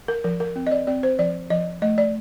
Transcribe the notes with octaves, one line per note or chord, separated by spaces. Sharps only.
A#4
F3 A#4
A#4
C4
D#5
D5
C4 D5
C5
F3 D5
F3 D#5
A3 D#5
D5